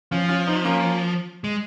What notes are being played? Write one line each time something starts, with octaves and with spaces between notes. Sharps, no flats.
F3 C#4 F4
C#4 F4
C4 D#4
A#3 C#4
G#3